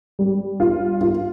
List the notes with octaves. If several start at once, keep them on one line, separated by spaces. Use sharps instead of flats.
G3
F4
F4